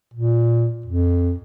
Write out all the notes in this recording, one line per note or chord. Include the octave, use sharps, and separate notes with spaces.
A#2
F2